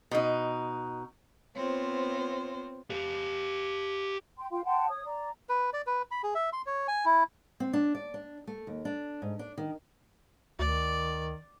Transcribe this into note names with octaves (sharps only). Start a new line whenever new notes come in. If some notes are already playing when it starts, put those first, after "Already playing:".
B2 D#4
B3 C4 F4 C5 C#5
G4 F5
G5 C6
F4 F5 G5 C6
F#5 G5 A5 C6
C#5 D#6
D5 A#5
B4
D5
B4
B5
G#4
E5
C6
C#5
G#5
E4
C4
D4
D5
D4
A3
D#2
D4
G#2
D4
D#3
D2 D#3 D5